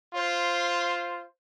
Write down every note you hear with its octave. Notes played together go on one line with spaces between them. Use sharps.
F4 C5